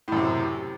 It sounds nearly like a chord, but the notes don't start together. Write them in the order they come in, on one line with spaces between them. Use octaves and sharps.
A2 F#2 C3